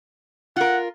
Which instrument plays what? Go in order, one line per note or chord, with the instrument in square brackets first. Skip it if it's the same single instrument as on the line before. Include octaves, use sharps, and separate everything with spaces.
[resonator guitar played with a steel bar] F4 A#4 [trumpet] F#5